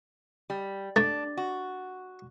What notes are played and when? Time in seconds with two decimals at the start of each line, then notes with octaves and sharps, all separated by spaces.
0.50 G3
0.96 A3 D4 A6
1.37 F#4